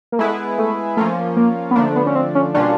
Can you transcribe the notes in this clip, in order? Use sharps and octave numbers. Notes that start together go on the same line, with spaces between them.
A#3
G#3 A3 B3 E4 G#4 B4
A3
F3 A3 A#3 C#4 F4
A#3
B3
D3 F3 A3 A#3 D4
B3
C#4
C4
C#4
B2 G3 A#3 C#4 D4 F4